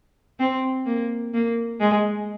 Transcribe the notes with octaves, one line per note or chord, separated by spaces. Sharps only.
C4
A#3
A#3
G#3